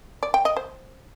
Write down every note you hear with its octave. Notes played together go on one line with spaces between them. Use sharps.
D5
G5
D#5
C5